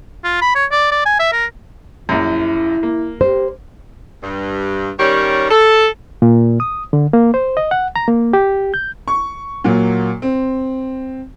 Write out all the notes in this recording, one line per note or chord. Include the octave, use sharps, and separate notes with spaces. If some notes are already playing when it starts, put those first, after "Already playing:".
F4
B5
C#5
D5
D5
G#5
E5
A#4
A#1 F#2 E4
A#3
G4 C5
G2
D#3 G3 C#4 A#4 C#5 D5
A4
A#2
D#6
D3
A#3
C5
D#5
F#5
A#5
A#3
G4
G6
C#6
A#2 F#3 A#3
C4